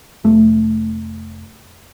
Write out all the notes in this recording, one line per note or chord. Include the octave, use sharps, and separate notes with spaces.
F1 A3